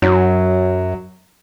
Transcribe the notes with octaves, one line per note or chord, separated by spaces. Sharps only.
F#2 F#3